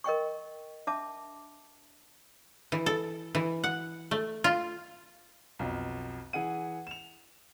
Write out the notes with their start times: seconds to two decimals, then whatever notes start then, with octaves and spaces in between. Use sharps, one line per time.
0.04 A#4 D#5 G5 C#6
0.87 D4 E5 A5 D6
2.72 E3
2.86 A4
3.35 E3
3.64 F#5
4.11 A3
4.44 F4
5.59 B1 F2
6.33 E3 G#4 F#5 D#7
6.87 E7 F7